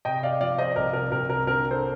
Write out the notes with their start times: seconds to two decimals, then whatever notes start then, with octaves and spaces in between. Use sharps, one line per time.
0.05 C3 D#5 G5
0.23 D5 F5
0.41 F3 D5 F5
0.58 C5 D#5
0.76 C2 A#4 D5
0.93 A#4
1.11 C2 A#4
1.30 A#4
1.47 D3 A#4
1.71 A4 C5